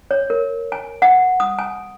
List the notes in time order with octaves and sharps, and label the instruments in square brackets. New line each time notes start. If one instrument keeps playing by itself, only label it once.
[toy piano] C#5
A#4
G#5
F#5
D#6
G#5